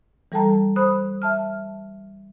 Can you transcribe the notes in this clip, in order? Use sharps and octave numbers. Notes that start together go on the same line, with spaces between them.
E3 G3 A4 G5 A5 A#5
C5 B5 D#6 F#6
E5 A5 F6